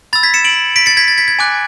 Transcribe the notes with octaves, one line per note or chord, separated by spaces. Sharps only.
B5 E6 A6
G#6 B6
C#7 E7
D7 F#7
B6 D7
A6 C#7
G#6 B6
A6
G#6 B6
G#6
G#5 D6 F#6